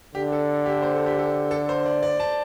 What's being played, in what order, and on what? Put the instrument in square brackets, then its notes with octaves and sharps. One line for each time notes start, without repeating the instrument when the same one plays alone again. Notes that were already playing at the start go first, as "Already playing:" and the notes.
[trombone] D3 [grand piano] G4
[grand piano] A4
G4
C5
A4
G4
A4
A4
C5
D5
D5
A5